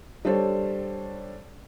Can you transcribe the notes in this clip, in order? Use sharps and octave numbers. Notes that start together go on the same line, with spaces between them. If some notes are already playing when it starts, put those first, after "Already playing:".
G3 D4 A4 C5 C#5